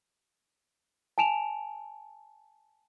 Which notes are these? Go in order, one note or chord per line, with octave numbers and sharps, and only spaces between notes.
G#5 A5 D7 E7 F7